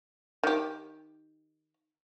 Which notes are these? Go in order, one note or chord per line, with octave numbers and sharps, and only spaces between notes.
D#3 G4